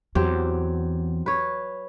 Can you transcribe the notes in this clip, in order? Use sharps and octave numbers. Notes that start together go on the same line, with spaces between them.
E2 F#3 C4 G4
B4 C#5